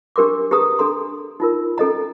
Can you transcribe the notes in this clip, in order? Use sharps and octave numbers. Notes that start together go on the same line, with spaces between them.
D4 G4 A#4 C6 D6
G4 G#4 B4 A#5 D#6
D4 A4 A#5 C6
D#4 F4 A#4
C#4 A4 D#5 A#5